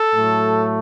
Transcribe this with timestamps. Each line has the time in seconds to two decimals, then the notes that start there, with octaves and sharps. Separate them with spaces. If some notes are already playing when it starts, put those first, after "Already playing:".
Already playing: A4
0.15 A2 F#3 A3